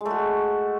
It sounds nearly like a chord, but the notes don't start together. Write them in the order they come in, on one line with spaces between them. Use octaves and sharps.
G#3 A3 F#4